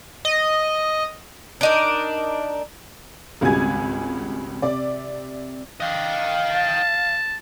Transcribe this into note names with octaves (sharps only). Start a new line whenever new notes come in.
D#5
D4 D#4 A#4
G#1 C#2 G3 F#4 G#5 G#6
C3 D5
D4 D#5 F5 G5
A5